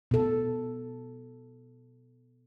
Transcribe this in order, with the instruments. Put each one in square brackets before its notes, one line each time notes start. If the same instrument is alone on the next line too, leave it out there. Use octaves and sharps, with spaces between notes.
[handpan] B2 A4